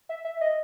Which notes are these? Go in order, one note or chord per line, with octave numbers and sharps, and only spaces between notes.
E5
E5
D#5